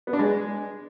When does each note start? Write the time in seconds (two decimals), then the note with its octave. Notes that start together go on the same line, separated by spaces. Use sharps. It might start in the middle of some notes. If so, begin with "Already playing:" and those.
0.07 B3
0.13 D4
0.19 G#3